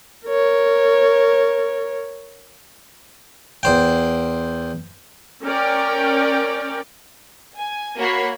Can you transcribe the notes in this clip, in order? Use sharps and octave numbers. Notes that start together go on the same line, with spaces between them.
A#4 C#5
E2 C5 G5
C#4 A#4 D5 G5
G#5
A#3 F#4 C#5 B5 C7